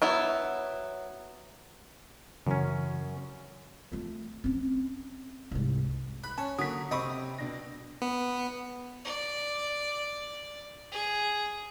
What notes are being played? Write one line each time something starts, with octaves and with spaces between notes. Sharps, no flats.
F#3 B3 E4
F#2 C#3 E3 F#3 C#4
A3 F4
C4 C#4
C2 G#2
B5 F#6
C#4 A5
D3 F#3 A#3 D#6 B6
C3 C4 D#5 B5 C#6 D#6
B2 D4 A#6
B3
D5
G#4